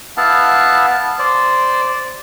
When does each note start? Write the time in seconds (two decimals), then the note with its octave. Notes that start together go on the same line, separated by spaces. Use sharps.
0.17 B3 E4 F5 A5
1.19 C5 D5